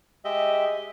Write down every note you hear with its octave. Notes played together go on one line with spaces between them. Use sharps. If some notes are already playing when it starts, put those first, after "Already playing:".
G#3 G4 D#5 E5